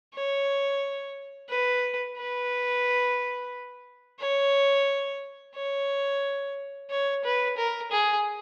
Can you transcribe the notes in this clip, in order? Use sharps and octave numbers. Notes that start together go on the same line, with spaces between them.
C#5
B4
B4
C#5
C#5
C#5
B4
A#4
G#4